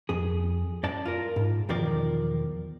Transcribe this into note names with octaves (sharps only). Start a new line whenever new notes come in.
F2 G#4
F#2 D5 A5
F4 A#4
G#2
B1 E2 D#3 F3 A#4 D5